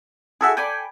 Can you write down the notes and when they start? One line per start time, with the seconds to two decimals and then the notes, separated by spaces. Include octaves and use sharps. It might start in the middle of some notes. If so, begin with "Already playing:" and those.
0.41 E4 F#4 G#4 A4 E5 G#5
0.57 A4 D5 G5 G#5 B5